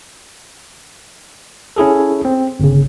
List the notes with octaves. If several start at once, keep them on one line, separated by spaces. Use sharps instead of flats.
C#4 E4 G#4 A4
C4
G1 C#3